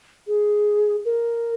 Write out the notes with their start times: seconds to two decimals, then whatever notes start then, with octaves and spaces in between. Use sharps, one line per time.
0.27 G#4
1.05 A#4